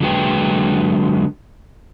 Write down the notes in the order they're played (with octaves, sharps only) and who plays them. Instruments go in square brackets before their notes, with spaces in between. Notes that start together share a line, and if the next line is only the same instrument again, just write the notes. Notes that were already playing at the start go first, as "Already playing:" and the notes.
[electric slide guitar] D3 F#3 G#3 A#3 B4 G5